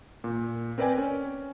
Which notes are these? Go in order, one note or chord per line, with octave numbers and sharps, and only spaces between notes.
A#2
C4 A#4 B4 D5 G5 G#5
C#4